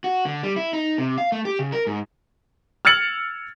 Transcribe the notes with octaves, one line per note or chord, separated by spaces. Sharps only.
F#4
D3
G3
E4
D#4
C3
F5
A3
G4
C#3
A#4
G#2
E6 F6 G#6 A6 C#7 F#7